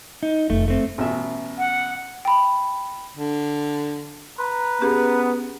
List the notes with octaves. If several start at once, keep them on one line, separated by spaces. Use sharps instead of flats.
D#4
F1 D#3 A3
A3 C4
A1 B2 E5
F#5
G5 B5
D3
B4 A#5 C6
B3 C#4 G4 G#4